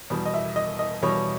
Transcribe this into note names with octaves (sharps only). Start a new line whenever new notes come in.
E2 B2 G3
D#5
E5
D#5
D#5
E2 B2 G3 C#5